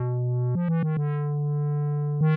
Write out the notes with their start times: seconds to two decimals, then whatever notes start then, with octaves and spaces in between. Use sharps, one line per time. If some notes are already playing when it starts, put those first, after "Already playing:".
Already playing: B2
0.55 F3
0.68 E3
0.83 D#3
0.97 D3
2.21 D#3